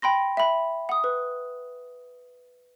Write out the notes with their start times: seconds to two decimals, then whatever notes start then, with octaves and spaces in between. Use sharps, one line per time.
0.02 G5 B5 C6 A#6
0.37 E5 B5
0.89 F#5 D#6
1.04 B4